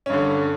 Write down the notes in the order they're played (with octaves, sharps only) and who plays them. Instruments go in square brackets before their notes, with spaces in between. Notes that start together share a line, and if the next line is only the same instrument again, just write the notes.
[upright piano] C#4
G2
D3